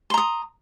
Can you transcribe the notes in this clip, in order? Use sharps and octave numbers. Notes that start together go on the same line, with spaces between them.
A#5 C6 D#6